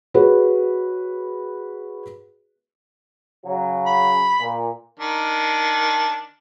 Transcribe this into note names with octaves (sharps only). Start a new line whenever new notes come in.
F#4 G#4 B4 C#5
C#3 F#3
B5
A#2
D#3 D4